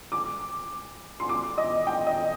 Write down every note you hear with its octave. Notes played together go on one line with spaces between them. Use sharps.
D6
C6
D6
D#5
G5
D#5